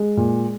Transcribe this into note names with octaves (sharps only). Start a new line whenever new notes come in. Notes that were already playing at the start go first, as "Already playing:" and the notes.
Already playing: G#3
A#2